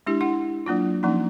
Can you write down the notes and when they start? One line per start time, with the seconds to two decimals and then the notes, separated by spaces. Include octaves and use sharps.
0.07 G#3 D4 E4 G4
0.21 E4 F#5
0.66 F#3 A#3 D4 F4
1.03 F3 A#3 C#4 D#4